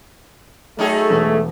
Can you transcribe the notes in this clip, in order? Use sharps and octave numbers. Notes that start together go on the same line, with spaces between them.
F#3 A3 D#4 G#4
E1